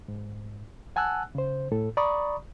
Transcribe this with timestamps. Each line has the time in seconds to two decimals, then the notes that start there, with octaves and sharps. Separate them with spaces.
0.08 G#2
0.96 F#5 G#5 A5 E6 F#6
1.35 C#3 C5
1.72 A2 A4
1.97 D5 A#5 B5 C#6 D#6